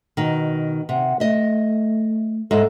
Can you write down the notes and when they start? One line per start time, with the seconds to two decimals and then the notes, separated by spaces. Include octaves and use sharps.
0.17 B2 D#3
0.89 C3 F#5
1.20 A3 D#5 E5
2.51 G#2 G#3 A4 E5